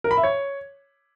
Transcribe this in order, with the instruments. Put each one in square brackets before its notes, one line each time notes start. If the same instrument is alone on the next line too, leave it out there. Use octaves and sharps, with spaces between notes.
[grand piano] A#4
B5
E5
C#5